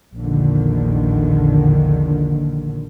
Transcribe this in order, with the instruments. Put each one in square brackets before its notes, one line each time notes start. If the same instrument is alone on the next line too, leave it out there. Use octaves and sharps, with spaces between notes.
[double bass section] A#1 E2 A#2 D3 D#3